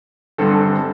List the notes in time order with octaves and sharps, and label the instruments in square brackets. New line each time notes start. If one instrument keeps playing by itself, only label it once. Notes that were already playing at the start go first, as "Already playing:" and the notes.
[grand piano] G1 G2 D3 C4 A4